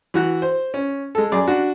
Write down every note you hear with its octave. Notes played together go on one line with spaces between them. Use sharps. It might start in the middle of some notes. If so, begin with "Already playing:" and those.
E3 F#4 F#6
C5
C#4
G#3 A4
F#2 G#4 D5 D6
D4 F#4